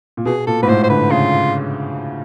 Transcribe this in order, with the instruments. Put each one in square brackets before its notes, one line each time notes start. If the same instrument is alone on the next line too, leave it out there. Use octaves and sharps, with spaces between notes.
[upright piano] A#2
[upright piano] B2 [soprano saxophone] G#4
[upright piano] A#2 [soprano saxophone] A4
[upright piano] G#2 [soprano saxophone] B4
[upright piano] A2 [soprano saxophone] C5
[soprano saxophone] C5
[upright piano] D3 [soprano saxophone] B4
[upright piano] C#3 [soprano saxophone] F4